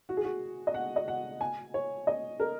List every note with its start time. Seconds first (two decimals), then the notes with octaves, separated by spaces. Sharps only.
0.09 F#4
0.17 G#4
0.25 F#4
0.67 D#5
0.74 F#5
0.96 D#5
1.08 F#5
1.41 G#5
1.74 C#5
2.07 D#5
2.40 A#4